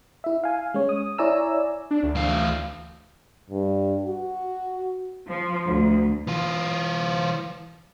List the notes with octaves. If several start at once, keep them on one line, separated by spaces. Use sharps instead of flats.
E4 E5
F5 G#5
G#3 C#4 C#5
D#6
E4 C#5 D5 G#5 A#5 E6
D4
D2
E3 A3 F5
G2
F#4
F3
D2
E3 F4